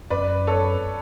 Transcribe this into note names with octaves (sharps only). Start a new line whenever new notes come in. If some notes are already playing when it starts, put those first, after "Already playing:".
F#2 B4 D5
A4 C#5